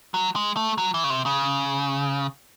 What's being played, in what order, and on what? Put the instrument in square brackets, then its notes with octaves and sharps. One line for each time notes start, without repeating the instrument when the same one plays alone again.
[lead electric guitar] F#3
G#3
A3
F#3
E3
C#3
C3
C#3